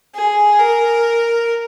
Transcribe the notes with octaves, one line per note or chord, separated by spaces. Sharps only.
G#4
A#4